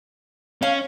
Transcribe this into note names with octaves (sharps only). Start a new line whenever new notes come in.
C#4 F5